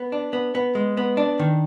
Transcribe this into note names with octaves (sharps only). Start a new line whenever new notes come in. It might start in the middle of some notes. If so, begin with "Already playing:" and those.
Already playing: B3
D4
B3
B3
G#3
B3
D4
D#3